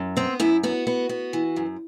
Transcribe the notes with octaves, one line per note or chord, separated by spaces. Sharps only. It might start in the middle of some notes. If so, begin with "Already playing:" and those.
Already playing: F#2
B3 C4
F#2 E4
B3 F#4
B3
B3
E3
F#2